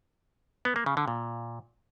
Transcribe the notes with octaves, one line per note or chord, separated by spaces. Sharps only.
B3
A#3
C#3
D3
A#2